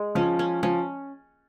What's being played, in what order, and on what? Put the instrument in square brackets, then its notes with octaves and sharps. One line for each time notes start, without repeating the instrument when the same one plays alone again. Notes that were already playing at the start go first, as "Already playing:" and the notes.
Already playing: [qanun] G#3
[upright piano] F3 [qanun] C#4
[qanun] C#4
[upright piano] F3 [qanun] C#4